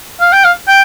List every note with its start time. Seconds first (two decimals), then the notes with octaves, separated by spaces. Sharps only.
0.21 F5
0.33 G5
0.45 F5
0.68 G5